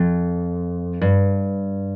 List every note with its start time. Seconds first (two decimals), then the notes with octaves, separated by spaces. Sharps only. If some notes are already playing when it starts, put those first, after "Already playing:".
Already playing: F2
1.01 G2